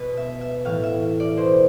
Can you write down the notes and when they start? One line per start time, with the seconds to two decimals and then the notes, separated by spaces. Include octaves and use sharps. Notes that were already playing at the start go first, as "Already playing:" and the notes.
Already playing: B2 B4
0.17 E5
0.41 E5
0.65 A2 E3 F5
0.84 E5
1.20 D5
1.37 B2 C5